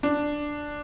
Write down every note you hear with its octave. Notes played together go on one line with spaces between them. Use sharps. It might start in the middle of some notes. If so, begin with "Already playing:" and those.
D4